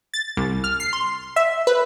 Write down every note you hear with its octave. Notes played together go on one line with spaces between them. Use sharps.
A6
C2
F6
C7
C6
E5
B4